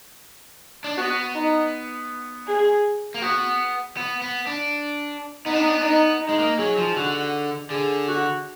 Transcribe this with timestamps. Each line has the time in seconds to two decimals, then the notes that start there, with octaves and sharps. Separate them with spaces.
0.84 D4
0.97 B3 F#4
1.35 D#4
2.47 G#4
3.14 A#3
3.22 B3 F#4
3.97 B3
4.22 B3
4.47 D4
5.46 B3 D#4
5.54 D4
5.61 B3
5.68 D4
5.74 B3
5.82 D4 D#4
5.89 B3
6.21 D#4
6.29 G#3
6.39 A#3
6.58 F#3 G#4
6.78 F3
6.96 D3 F#4
7.70 D3 G#4
8.08 F#4